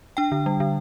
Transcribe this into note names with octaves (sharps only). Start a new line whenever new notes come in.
D4 G5
D3
G3
D3